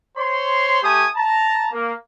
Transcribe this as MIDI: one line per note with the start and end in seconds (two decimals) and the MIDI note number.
0.18 0.81 72
0.18 0.81 73
0.18 0.81 84
0.83 1.05 57
0.83 1.05 67
0.83 1.05 80
0.83 1.05 87
1.15 1.67 81
1.15 1.67 82
1.72 1.92 58